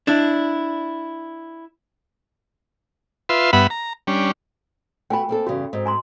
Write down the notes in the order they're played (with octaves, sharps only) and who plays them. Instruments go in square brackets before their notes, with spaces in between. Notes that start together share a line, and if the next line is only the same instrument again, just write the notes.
[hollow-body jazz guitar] D4 E4
[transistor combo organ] F4 B4 E5 C6
G2 B3 E5 F#5 B5
A#5
G3 C#4 D4
[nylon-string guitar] A3 B3 F#4 [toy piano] G5 G#5 B5
[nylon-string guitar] A#3 C4 A4
[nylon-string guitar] E2 G2 C#3 [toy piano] F#4
[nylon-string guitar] G#2 C4
[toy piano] G#5 A#5 C6